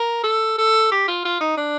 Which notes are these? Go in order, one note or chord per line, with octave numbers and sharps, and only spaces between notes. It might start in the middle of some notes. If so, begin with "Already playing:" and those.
Already playing: A#4
A4
A4
G4
F4
F4
D#4
D4